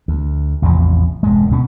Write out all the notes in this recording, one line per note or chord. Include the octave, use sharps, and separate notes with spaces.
D2
A1 E2 C3 F3
E1 G2 G#3
D2 B2 C#4